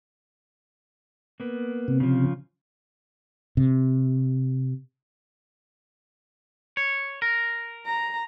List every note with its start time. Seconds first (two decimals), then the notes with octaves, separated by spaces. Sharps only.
1.40 A#3 B3
1.88 C3
2.00 C#3 F3
3.57 C3
6.77 C#5
7.22 A#4
7.86 A#5